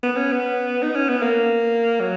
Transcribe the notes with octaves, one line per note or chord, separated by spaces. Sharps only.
B3
C#4
B3
D#4
C#4
B3
A#3
F#3